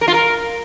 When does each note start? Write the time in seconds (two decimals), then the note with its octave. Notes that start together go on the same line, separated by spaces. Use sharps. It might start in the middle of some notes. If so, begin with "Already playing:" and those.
0.01 A#4
0.08 F4
0.14 A#4